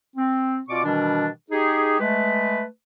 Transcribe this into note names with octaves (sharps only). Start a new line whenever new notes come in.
C4
B2 C4 F4 D5 C#6 D6
B2 D#3 E3 G3 D4
D#4 G4 G#4
G#3 A3 B4